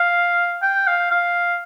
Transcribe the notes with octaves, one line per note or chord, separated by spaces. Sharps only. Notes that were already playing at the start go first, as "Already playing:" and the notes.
Already playing: F5
G5
F5
F5